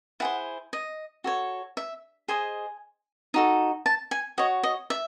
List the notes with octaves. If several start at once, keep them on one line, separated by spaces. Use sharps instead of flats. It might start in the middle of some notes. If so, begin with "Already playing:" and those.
E4 G#4 C5 F#5
D#5
F#4 A4 C#5
E5
G#4 C5 D#5 G#5
D#4 F#4 A4
A5
G#5
F#4 C#5 D#5
D#5
E5